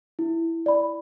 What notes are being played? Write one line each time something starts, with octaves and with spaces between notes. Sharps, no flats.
E4
D5 B5